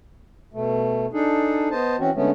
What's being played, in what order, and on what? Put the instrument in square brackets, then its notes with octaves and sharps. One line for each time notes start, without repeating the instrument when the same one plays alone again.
[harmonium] B2 A3
D4 D#4 G#4 A4
B3 C5 D#5 A5
E3 C4 C#4 F#4
D3 G#3 A3 B3 C#4